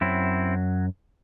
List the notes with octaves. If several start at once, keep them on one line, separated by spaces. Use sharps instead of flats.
F#2 F#3 C4 E4